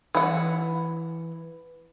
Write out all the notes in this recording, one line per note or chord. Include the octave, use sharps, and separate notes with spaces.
E3 F#5